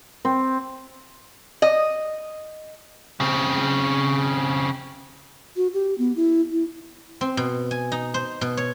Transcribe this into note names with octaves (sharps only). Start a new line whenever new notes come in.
C4
D#5
C#3 C4
F#4
G4
B3
E4
E4
C4
B2
G#5
D#4
C5
B2
C#5